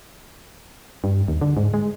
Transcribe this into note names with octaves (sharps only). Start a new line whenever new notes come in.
G2
D#2
D3
G#2
G#3